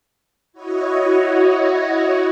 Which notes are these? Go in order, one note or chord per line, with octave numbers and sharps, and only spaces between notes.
E4 F#4 C#5 D#5